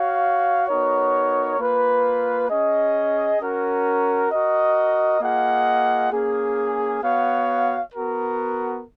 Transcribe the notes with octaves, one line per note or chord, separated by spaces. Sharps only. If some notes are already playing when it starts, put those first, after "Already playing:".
Already playing: F#4 C#5 F5
B3 D#4 F#4 A#4 C#5
A#3 F4 B4
C#4 G#4 D#5
C#4 F#4 A#4
F#4 A#4 D#5
A#3 F4 G#4 D#5 F#5
A#3 C#4 G#4
B3 F#4 C#5 F5
B3 F#4 A#4